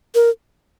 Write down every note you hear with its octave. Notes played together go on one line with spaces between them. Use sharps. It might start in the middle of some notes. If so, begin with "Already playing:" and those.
A#4